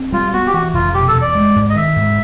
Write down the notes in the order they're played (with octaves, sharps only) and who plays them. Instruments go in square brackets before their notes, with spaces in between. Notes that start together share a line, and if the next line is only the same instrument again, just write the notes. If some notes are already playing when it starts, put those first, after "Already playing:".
Already playing: [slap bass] C4
[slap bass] G3 [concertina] F4
[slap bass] B3 [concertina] F#4
[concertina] G4
[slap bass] E3 [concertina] F#4
[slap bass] F1 [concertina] F4
[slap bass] B2 [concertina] G4
[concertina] A4
[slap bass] E2
[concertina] D5
[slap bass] G#3
G#2
[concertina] D#5
[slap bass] D#3 [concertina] E5
[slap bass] G#2